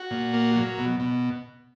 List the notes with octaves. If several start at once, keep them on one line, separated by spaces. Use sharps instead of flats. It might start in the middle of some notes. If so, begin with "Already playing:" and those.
Already playing: F#4
A#2
A#3
F#3
B2
B2